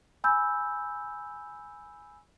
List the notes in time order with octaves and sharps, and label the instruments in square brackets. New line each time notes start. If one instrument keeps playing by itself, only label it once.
[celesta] G#5 B5 E6 G6